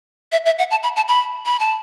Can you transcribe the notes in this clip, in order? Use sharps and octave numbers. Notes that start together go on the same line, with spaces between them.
E5
E5
F#5
A5
B5
A5
B5
B5
A5